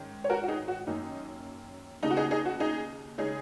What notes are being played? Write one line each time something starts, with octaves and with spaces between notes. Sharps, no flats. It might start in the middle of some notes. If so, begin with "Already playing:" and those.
Already playing: G#2 D#3 C#4
C#5
F#4 A#4
F#4
D#4 G#4
F#4
F#2 D#3 A#3 C#4 D#4
D#2 C#3 A#3 D#4
F#4
D#4 G#4
D#4 G#4
F#4
D#4 G#4
C#3 G#3 C#4 D#4 G#4